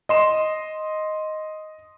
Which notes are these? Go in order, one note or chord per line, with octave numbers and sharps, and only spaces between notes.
D#5 C6 E7